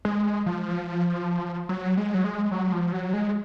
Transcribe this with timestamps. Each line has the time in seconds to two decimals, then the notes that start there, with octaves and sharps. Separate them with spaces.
0.05 G#3
0.46 F3
1.69 F#3
1.97 G#3
2.14 F#3
2.24 G#3
2.51 F#3
2.72 F3
2.93 F#3
3.13 G#3